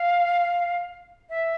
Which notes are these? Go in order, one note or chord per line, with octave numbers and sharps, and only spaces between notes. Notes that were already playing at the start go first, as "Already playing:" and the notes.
Already playing: F5
E5